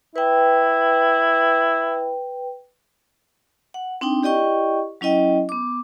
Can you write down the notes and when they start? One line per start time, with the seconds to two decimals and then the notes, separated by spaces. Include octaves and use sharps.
0.16 E4 B4 G5
3.74 F#5
4.01 C4 D4 D#4 G5
4.23 E4 G4 D5 D#5 G5 C#6
5.01 F#3 C#4 E4 D#5 G5
5.49 B3 D6